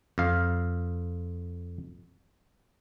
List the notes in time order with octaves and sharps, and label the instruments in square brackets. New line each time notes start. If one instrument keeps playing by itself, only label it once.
[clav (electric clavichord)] F2 F5